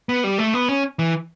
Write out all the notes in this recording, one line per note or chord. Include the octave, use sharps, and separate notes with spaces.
B3
G3
A3
B3
C#4
E3